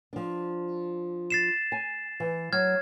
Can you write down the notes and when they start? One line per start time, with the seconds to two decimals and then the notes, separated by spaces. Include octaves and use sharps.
0.13 F3 D4
1.30 A6 C7 E7
1.72 G#5
2.20 E3
2.53 F#3 F6 G#6